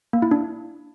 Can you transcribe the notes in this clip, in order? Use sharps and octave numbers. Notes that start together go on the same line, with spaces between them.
A#3
E4
D4